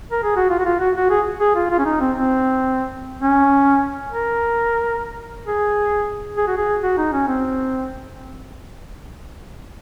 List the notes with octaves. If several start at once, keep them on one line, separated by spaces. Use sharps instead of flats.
A#4
G#4
F#4
F4
F#4
F4
F#4
F#4
G#4
G#4
F4
F4
C#4
D#4
C4
C4
C#4
A#4
G#4
G#4
F#4
G#4
F#4
D#4
C#4
C4